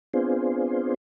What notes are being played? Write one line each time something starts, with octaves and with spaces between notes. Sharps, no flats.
B3 C4 D4 F4 G#4 C5